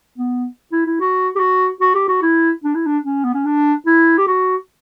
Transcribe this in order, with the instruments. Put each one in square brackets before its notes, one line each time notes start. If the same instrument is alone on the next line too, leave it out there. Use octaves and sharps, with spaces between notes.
[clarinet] B3
E4
E4
F#4
G4
F#4
F#4
G4
F#4
E4
D4
E4
D4
C#4
B3
C#4
D4
E4
G4
F#4